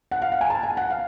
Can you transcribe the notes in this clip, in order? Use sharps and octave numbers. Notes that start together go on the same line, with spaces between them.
F#5
F5
F#5
G#5
A5
G#5
F#5
F5